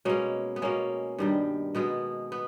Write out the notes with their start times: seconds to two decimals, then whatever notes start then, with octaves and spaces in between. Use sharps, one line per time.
0.05 B2 G#3 A#3 C#4
0.56 B3
0.62 B2 G#3 A#3 C#4
1.18 G2 D#3 G3
1.75 B2 G#3 B3
2.32 B3